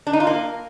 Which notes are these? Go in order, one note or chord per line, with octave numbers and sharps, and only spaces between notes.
D4
D#4
F4
A#3